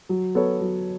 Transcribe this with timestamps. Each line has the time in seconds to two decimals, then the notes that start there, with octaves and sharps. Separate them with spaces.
0.09 F#3
0.35 B3 A4 C#5
0.61 F#3